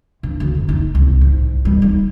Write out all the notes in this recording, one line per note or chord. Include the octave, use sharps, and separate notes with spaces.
G2
D2
F#2
D#4
C2
G#2
G3
D#4